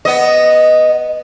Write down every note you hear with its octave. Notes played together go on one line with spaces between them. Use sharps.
B3 D#5